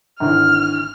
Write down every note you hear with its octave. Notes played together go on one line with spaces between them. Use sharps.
G#1 D3 E3 F6